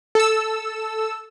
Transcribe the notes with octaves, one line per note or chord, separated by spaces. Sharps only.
A4 E6